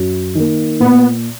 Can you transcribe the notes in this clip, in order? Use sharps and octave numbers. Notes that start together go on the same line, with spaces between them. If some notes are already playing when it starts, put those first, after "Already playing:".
Already playing: F#2
D#3 A#3
A#2 B3